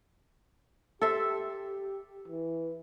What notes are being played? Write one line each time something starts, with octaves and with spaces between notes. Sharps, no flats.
G4 A4 C5 E5
E3